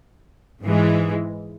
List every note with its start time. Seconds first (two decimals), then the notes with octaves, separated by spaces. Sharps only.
0.63 G#2 E3 G#3